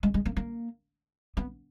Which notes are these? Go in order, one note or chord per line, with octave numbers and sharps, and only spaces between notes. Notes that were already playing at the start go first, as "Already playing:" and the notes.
G#3
G#3
A#3
A#3
B3